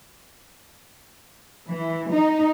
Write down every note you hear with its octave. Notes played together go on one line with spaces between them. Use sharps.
E3
D#4